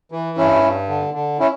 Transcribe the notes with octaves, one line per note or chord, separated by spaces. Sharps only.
E3
G2 C#4 E4
G2
D3
D3
C#4 E4